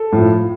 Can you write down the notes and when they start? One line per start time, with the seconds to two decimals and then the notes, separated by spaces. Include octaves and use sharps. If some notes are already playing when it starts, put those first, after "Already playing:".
Already playing: A4
0.12 A2 F3